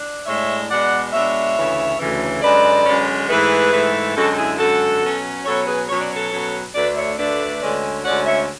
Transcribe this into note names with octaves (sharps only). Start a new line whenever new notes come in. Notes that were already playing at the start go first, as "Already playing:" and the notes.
Already playing: D4
A2 G#3 D4 C#5 E5
B2 G#3 D4 D5 F#5
B2 G#3 D4 C#5 E5
D2 C#3 E3
D2 C#3 E3
F#2 D3 G#3 C#4 B4 D5
F#2 D3 G#3 C#4
G#2 E3 A3 G#4 B4
G#2 E3 A3
F#2 D3 G#3 F#4 A4
A4
E4 G#4
F#2 D3 G#3 F#4 A4
B2 F#3 C#4
B2 F#3 C#4 A4 C#5
G#4 B4
B2 F#3 C#4 C#5
D5
A4 C#5
B2 F#3 C#4
D2 D3 A3 D4 B4 D5
C#5 E5
D2 D3 A3 D4 B4 D5
D2 D3 G#3 C#4
D2 D3 G#3 C#4 D5 F#5
C#5 E5